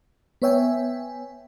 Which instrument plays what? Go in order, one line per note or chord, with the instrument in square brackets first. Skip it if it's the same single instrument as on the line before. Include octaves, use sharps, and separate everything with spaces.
[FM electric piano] B3 B4 C#5 E5 G5 G#5